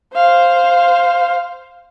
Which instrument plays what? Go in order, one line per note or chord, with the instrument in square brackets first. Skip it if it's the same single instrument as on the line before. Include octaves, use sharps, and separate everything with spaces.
[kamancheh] C5 F5